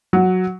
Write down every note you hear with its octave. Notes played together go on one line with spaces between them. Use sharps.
F#3